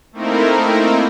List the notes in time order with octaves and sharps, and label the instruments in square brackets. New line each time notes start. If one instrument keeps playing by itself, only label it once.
[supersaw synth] A3 A#3 C4 D#4 E4 A#4